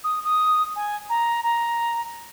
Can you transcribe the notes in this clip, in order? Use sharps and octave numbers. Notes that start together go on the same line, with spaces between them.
D#6
D#6
G#5
A#5
A#5